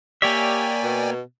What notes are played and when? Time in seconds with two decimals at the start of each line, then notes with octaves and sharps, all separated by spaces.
0.22 A#3 G4 C#5 D5 E5 G5 G#5
0.83 B2